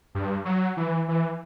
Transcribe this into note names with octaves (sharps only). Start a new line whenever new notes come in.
G2
F#3
E3
E3